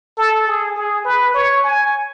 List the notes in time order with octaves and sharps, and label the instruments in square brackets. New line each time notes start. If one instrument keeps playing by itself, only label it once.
[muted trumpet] A4
G#4
G#4
B4
C#5
G#5